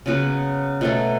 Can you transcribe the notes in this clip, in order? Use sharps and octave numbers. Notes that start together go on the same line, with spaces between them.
C#3 F#3 B3 F#4
B2 F#3 A3